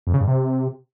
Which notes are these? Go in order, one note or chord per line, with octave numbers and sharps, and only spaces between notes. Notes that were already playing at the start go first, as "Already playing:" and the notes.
F2
C#3
G2
C3